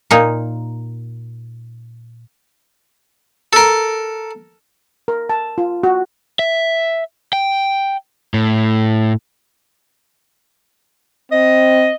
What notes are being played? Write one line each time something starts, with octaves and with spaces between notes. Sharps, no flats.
A#2 A#3 D#4
A4 A#4
A#4
A5
F4
F#4
E5
G5
A2
C4 D#5